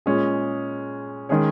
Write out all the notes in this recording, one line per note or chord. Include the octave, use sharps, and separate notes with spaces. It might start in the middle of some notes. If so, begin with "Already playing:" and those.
A#2 G#3 C#4 G#4
D#3 G#3 C#4 G#4 C#5